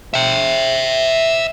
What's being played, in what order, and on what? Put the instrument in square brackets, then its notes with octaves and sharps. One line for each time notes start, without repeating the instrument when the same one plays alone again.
[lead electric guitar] E5 G5